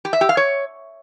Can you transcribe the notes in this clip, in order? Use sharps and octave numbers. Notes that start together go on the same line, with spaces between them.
G4
E5
G4
F5
C#5